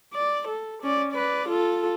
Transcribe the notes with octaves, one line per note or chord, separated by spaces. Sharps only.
D5
A4
C#4 D5
B4 D5
F4 A4